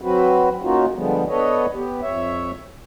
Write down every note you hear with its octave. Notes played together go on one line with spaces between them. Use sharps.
F#3 C4 F#4 B4
A#3 C#4 D#4 F4 F#4
D3 F3 G3 G#3 B3
B3 D4 A4 B4 C#5 D#5
B3 G4
F2 C#5 E5